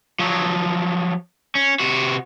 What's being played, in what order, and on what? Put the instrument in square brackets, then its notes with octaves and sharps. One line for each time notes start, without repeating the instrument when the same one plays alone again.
[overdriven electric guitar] F3 F#3
C#4
C3 F#4